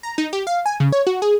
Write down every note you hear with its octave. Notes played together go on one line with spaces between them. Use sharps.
A#5
D#4
G4
F5
G#5
C#3
C#5
F#4
G#4